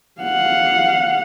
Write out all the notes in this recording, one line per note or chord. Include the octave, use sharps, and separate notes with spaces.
F5 F#5